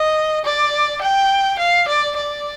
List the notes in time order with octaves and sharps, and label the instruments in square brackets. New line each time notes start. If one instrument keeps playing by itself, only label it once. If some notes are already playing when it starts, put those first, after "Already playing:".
Already playing: [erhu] D#5
D5
G5
F5
D5
D5